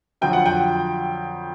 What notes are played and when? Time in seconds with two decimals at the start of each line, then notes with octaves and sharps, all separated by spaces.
0.22 F2 D3 F#3 G5
0.33 F#5
0.46 G5